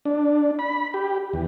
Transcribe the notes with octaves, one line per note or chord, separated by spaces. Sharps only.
D4
B5
G4
E2